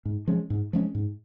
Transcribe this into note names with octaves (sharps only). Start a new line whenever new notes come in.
G#2
F3 G#3 C#4
G#2
F3 G#3 C#4
G#2